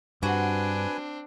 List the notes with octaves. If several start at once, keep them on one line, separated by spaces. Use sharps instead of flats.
G2 C4 D4 F#4 B4 G#5